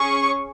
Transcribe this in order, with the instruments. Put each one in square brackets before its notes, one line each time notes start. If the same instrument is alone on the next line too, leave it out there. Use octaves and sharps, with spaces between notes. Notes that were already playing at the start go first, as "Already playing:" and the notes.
Already playing: [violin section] C#4 G#4 C#6